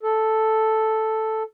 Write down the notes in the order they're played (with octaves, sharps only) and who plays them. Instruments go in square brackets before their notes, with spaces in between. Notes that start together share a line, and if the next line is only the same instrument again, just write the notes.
[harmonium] A4